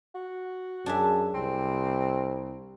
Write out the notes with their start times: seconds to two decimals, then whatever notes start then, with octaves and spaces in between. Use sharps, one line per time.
0.15 F#4
0.86 F#2 D4 G#4 E5
1.34 C2 C4